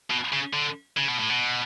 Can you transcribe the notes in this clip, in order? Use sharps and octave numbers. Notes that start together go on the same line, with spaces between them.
B2
C#3
D3
C#3
B2
A2
B2